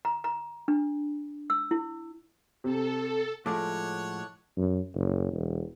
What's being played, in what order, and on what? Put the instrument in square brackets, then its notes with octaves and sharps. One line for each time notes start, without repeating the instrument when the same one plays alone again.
[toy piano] A#5
A#5
D4
E6
E4
[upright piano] C3 [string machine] A4
[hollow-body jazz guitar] A2 F3 G#3 [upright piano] A4 A5 D6 [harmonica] C#5 F#5
[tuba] F#2
F#1
E1